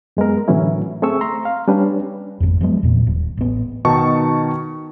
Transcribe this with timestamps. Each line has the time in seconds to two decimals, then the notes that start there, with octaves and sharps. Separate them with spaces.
0.17 F#2 G#3 B3 A#4
0.48 A2 D3 E3 F#3 C#4 E4
1.02 A3 C4 G#4 C#6 E6
1.21 A#5 C6
1.45 F5
1.68 G3 C#4 D4 B4
2.40 G#1 F2
2.61 F3 F#3 G#3 B3
2.83 E2 A#2
3.07 D#1
3.37 A1 B3
3.85 B2 D#3 D#4 A5 C#6